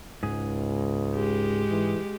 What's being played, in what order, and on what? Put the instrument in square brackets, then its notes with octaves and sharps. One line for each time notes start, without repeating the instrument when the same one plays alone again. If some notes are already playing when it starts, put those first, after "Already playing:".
[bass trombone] C#2 [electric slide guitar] G#2 G#4
[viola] G#3 G4
[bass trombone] E3